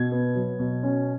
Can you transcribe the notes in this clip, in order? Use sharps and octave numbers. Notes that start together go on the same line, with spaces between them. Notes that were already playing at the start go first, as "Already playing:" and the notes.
Already playing: B2 G#6
B3
F#3
B2
C#4